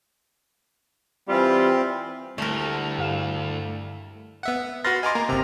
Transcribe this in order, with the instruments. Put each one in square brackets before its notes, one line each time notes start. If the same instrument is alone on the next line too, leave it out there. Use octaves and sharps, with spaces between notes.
[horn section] E3 G3 F4 [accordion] C4
[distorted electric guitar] D2 [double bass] G3 E4 [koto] A3 A#4
[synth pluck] G2 F5 E7
[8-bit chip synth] B3 E5 F#5
[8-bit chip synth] F#4 B4 C6 [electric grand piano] F6 A6 A#6
[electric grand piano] D#5 C6 [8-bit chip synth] G#5 A#5 D6
[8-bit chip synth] A#3 [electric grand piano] A#5
[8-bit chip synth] G1 A#5 [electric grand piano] C3